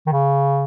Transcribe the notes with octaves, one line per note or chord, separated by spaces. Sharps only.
D#3
C#3